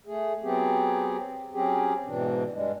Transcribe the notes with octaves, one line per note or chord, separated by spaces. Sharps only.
A3 G#4
F#3 B3 C4 G4 G#4
F#3 C4 C#4 G4 G#4
G#2 B2 E3 D4
G2 G3 G#3